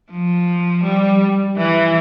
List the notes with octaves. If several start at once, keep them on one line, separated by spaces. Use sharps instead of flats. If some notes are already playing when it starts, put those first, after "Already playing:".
F3
G3
E3